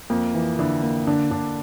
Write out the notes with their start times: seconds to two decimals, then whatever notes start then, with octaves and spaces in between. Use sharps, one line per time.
0.10 F2 A#3
0.34 E3
0.59 D3 E4
0.83 A#3
1.07 D3 D4
1.31 D3 D4